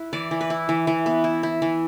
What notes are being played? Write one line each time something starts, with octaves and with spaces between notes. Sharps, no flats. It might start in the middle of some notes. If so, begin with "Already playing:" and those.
Already playing: E4 B4
E3 D5
E3
B4
E4
E3
E3
B3
E4
E4
E3